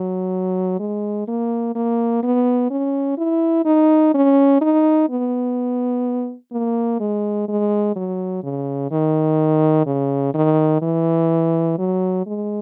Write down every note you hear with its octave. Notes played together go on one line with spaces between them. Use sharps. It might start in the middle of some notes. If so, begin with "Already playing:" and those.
Already playing: F#3
G#3
A#3
A#3
B3
C#4
E4
D#4
C#4
D#4
B3
A#3
G#3
G#3
F#3
C#3
D#3
C#3
D#3
E3
F#3
G#3